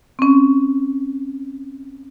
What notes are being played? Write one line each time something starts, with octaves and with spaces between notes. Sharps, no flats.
C4 C#4